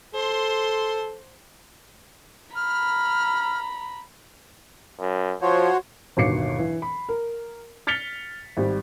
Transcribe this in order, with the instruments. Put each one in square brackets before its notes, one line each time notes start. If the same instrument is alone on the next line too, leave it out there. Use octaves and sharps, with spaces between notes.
[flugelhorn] A4 [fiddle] C5 C6
[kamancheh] A#5 B5 [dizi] F6
[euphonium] F#2
[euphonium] F3 [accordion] F#4 C5 C#5
[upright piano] G1 D#2 B2 D6 C7 C#7
E3
B5
A#4
F6 A6 B6 C#7 F7 G7
G#1 G3